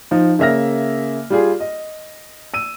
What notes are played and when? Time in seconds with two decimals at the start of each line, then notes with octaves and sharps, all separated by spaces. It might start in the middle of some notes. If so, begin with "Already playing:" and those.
0.11 F3 D#4
0.39 C#3 A#3 E5 F6 A#6
1.30 G3 F4 G#4
1.60 D#5
2.54 E6 D#7